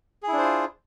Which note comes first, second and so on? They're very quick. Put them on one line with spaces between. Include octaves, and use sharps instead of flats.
G#4 E4 D4 C5 F4